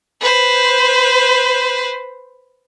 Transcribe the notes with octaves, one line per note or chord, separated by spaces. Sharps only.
B4 C5